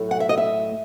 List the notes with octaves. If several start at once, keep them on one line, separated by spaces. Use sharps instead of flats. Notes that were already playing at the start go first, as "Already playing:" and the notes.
Already playing: A2 F#3 A3
F#5
E5
D#5
E5